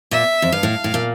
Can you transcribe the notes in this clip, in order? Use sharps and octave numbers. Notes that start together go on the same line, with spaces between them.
A#2 E5
F2
G2 F5
A2
A2
A#2